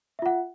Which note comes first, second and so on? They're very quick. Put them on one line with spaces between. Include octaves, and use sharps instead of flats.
E5 F4 F#5